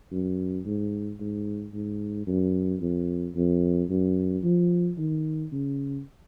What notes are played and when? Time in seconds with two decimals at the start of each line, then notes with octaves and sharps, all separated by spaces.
0.11 F#2
0.65 G#2
1.20 G#2
1.73 G#2
2.27 F#2
2.81 F2
3.35 F2
3.90 F#2
4.44 F3
4.98 D#3
5.52 C#3